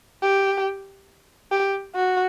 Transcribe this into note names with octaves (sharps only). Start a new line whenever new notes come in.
G4
G4
F#4